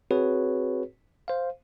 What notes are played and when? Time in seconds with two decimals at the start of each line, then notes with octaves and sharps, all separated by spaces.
0.11 C4 F#4 G#4 B4 C#5
1.28 C5 F5